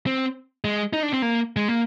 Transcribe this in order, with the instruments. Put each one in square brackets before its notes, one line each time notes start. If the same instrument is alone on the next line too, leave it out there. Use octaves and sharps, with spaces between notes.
[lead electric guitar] C4
G#3
D#4
D4
C4
A#3
G#3
A#3